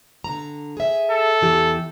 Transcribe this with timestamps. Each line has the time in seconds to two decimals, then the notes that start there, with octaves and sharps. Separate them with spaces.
0.24 D3 A#5
0.77 G#4 E5
1.11 A4
1.41 E2 E3 G4